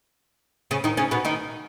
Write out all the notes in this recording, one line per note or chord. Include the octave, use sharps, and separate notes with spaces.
C#3 C#4
D#3 D#4
C#3 C#4
B2 B3
D#3 D#4